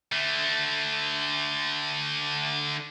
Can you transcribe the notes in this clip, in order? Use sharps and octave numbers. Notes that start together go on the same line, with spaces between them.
D3 A3